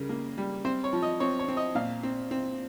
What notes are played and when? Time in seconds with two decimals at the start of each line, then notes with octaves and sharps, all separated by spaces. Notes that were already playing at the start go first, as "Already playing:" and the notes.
Already playing: C#3 G3 A#4
0.09 A#3
0.38 G3
0.65 C4 C5
0.84 C#5
0.93 F3
1.03 D#5
1.20 C4 C#5
1.39 C#5
1.48 C4
1.57 D#5
1.75 A#2 F5
2.03 C4
2.31 C4